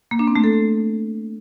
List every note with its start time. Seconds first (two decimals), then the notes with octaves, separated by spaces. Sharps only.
0.11 A#3
0.19 D4
0.27 C4
0.36 A3
0.44 A4